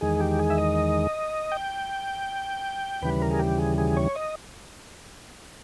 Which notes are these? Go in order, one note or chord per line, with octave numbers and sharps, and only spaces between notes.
E2 D#3 G#3 G#4
G4
G#4
E5
D#5
G5
D#2 C#3 E3 G3 B4
A#4
G#4
G4
G#4
G#4
C#5
D#5